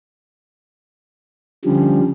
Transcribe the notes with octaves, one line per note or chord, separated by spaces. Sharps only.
D3 F3 G3 C#4